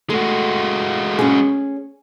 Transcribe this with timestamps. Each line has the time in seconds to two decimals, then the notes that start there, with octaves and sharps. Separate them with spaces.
0.10 G#3 A3 F#4
1.19 C#4 G#4